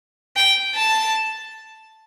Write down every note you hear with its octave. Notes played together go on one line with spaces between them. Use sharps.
G5
A5